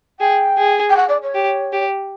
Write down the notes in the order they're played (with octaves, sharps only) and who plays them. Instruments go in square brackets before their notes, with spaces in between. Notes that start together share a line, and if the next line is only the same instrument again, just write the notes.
[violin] G#4 [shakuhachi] G5
[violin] G#4
[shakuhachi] G5
F#5
D5
C#5
[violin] G4
G4